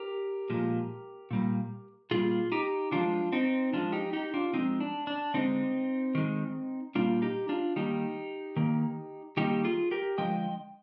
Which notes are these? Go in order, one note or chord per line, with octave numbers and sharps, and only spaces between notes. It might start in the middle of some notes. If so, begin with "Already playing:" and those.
Already playing: G4 A#4
A#2 F3 G#3
A#2 G3 A#3
A#2 G3 A#3 F4 G#4
D#4 G4
D3 F3 G#3 D4 F4
C4 D#4
D3 F3 G#3 D4 F4
D#4 G4
D#4 G4
D4 F4
D3 F3 G#3 C4 D#4
D4
D4
D3 G#3 C4 D#4
D#3 G#3
A#2 G3 A#3 D4 F4
D#4 G4
D4 F4
D#3 G3 A#3 D#4 G4
D#3 A#3
D#3 G3 A#3 D#4 G4
F4 G#4
G4 A#4
D3 F3 G#3 D#5 G5